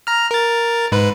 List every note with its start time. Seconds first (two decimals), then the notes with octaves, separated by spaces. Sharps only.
0.07 A#5 F6
0.31 A#4 A6
0.92 G#2 B4